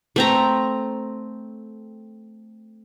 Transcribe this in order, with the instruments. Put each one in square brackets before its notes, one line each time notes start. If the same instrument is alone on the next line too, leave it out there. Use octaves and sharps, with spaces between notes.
[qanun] A3 C4 A#5